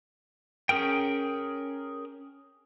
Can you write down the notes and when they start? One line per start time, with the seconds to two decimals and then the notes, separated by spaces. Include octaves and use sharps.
0.69 C#4 G#4 A#4 G5